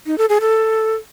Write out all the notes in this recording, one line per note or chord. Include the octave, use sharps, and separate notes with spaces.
D#4
A4
G#4
A4